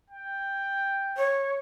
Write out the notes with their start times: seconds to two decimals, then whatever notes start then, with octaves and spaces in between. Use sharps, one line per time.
0.10 G5
1.17 C#5